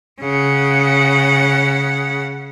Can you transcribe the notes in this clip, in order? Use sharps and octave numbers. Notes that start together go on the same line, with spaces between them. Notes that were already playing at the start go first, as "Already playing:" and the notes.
C#3 F#5